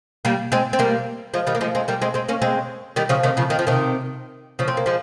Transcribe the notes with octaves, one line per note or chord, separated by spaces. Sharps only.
G3 A#3
G#3 C4
C4
G3 A#3
F3 G#3
D#3 G3
A#3
F3 G#3
G#3 C4
G3 A#3
G#3 C4
G#3 C4
A#3 C#4
G#3 C4
D#3 G3
C#3 F3
C3 D#3
C#3 F3
D#3
F3
C3 D#3
C#3 F3
C4
A#3
F3 G#3